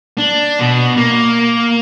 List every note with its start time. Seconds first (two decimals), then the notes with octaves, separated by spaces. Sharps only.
0.18 D4
0.59 B2
0.97 A#3